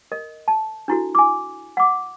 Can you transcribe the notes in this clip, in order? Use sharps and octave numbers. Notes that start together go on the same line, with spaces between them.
A#4 D#5
A5
D4 E4 F#4 A4
G#5 D6
F#5 D6